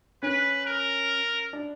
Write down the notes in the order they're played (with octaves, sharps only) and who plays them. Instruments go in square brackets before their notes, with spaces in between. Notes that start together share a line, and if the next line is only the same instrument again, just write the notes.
[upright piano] C#4 [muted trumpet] B4
[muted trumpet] A#4
[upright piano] D4